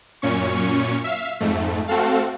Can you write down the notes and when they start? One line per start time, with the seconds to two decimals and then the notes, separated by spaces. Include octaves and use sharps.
0.22 F#2 A#2 C#4 C#6
1.04 E5 F5
1.40 F2 G#2 A3
1.88 A3 C4 F#4 A4 F5